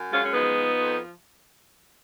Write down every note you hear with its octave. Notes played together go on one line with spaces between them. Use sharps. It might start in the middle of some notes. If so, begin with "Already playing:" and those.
Already playing: F#2
G#3 C#4 F4
C#4
F3 B3 D#4
F3
F2